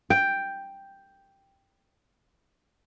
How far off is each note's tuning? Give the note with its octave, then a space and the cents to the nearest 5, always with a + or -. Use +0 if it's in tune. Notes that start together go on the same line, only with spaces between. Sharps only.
G5 +5